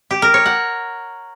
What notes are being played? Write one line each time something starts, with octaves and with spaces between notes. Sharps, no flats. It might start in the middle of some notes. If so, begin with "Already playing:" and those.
G4
A#4
C#5
F#5